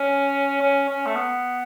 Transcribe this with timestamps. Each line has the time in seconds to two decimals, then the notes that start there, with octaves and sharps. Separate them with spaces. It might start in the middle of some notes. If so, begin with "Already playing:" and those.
Already playing: C#4
0.61 C#4
0.89 C#4
1.06 A3
1.16 B3